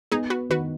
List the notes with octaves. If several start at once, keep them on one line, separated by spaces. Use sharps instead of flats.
B3 D#4 G#4
F#4 B4
D#3 F#4 B4